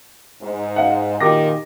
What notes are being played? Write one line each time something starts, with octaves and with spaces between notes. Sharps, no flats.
G#2
F5 F#5
A#2 D#3 G4 D6 A#6